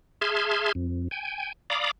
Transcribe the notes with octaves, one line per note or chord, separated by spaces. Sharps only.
G#4 E5 A5 C6 F6 G#6
F2
G5 G#5
D5 F5 A#5 B5 D6 D#6